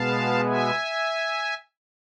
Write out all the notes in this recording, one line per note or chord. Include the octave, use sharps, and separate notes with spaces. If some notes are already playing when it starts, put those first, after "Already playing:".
Already playing: B2 G#3 B3 F5 A5
E5 G#5